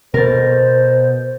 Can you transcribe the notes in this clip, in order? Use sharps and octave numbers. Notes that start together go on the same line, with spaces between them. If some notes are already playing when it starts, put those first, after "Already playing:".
B2 B3 A#4 C5 A6